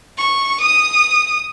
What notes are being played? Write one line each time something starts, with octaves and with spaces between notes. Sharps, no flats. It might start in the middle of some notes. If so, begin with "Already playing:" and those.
C#6
D#6